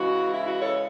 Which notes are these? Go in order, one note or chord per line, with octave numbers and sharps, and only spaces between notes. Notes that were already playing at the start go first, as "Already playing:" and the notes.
Already playing: C#3 E3 G#3 F#4
E4
F#4
A4 C#5